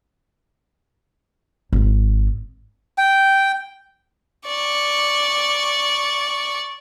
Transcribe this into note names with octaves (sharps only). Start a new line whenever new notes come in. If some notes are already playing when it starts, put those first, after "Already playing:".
G#1
G5
D5 C#6